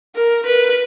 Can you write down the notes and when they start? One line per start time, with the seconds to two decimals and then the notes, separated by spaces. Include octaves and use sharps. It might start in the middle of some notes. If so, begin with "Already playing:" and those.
0.16 A#4
0.46 B4